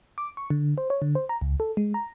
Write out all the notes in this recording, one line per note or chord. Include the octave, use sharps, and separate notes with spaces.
D6
C#6
D3
C5
C#5
D3
C5
A#5
C#2
A4
G#3
A#5